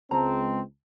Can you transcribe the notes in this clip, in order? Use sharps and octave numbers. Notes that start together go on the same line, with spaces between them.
C#2 G#3 C4 A5 A#5